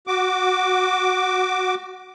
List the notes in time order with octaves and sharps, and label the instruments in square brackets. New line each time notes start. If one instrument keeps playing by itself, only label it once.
[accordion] F#4 D6